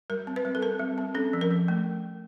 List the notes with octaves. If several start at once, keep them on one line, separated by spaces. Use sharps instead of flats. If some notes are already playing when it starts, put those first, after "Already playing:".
G3 A#4
C4
B4
G3
A4
C4 A#4
G3
C4
C#4 A4
F3
A#4
F3
A3